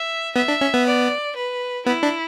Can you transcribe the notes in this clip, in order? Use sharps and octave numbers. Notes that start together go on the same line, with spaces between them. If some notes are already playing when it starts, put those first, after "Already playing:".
Already playing: E5
B3 E5
D4
C#4
B3
D5
B4
B3 E4
D4